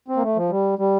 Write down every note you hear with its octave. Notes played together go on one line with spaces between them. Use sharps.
C4
A#3
A3
F3
G3
G3